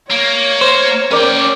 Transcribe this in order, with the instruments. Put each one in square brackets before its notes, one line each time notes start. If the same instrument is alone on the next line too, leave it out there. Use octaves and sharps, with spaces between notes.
[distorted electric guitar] A#3 [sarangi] C#5
[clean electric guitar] C5
[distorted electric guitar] C#4 G5 [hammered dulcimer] A#4 D5